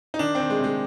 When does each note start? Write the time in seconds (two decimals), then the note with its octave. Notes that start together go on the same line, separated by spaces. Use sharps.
0.14 D#4
0.19 D#3 D4
0.35 D#3 C4
0.50 G#3
0.59 C3
0.64 G#3